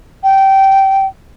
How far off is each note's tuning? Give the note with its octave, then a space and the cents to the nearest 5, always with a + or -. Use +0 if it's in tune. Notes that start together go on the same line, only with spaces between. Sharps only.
G5 -20